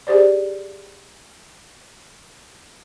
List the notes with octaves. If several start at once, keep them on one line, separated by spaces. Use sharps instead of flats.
G4 G#4 C5 D5